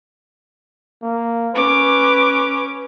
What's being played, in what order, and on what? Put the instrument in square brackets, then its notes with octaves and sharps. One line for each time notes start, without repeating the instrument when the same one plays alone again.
[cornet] A#3
[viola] C#4 D6 [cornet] B4